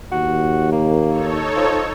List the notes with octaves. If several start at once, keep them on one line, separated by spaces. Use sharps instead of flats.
D#2 F#4
A#3
D#4 A4 C#5
F3